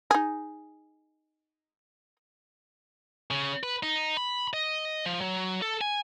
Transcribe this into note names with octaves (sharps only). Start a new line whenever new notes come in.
D#4 G#4
C#3
B4
D#4
B5
D#5
F3
F#3
A4
G#5